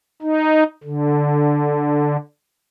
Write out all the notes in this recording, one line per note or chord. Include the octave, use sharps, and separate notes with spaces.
D#4
D3